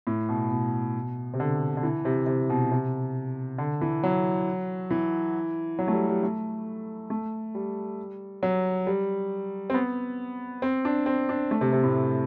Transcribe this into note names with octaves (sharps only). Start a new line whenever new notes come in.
A2
B2
B2
C3
D3
D3
E3
C3
C3
B2
C3
D3
E3
F#3
E3
F#3
A3
G3
G3
A3
A3
G3
F#3
G3
C4
B3
C4
D4
C4
D4
A3
C3
C3
A2